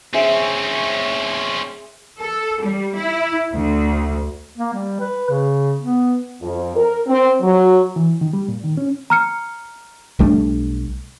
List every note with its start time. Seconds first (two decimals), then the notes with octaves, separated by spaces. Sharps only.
0.13 C4 C#4 G#4 E5 G#5
2.20 A4
2.62 G3
2.96 E4
3.53 D2
4.58 A#3
4.73 G3
5.00 B4
5.30 C#3
5.80 B3
6.42 F2
6.76 A#4
7.07 C4
7.41 F#3
7.96 E3
8.21 D#3
8.33 G3
8.48 A#2
8.64 D#3
8.77 C#4
9.10 A#5 F6 C#7
10.19 B1 G3 A3 D4